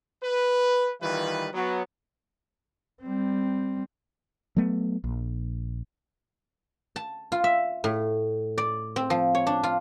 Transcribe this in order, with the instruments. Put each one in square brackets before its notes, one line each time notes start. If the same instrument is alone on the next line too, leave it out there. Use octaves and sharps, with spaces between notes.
[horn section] B4
D#3 E3 G3 F4 B4
F#3 B3
[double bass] G3 C4
[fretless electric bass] F#3 A3 B3
A#1
[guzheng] A5
F4
E5
A2
D5
C4
F3
C#5
D4
F4